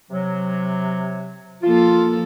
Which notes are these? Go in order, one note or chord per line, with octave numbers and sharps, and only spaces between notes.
C3 F#3
F3 A#3 F4 A4